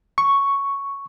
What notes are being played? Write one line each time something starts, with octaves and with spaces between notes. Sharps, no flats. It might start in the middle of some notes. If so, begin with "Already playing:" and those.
C#6